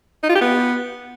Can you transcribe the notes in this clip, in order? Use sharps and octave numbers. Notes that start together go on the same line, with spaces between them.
D#4
F4
G4
B3